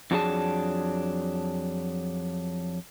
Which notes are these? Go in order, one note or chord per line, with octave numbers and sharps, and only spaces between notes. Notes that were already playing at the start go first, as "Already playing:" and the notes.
F2 F#3 D4 E4 G#4 A5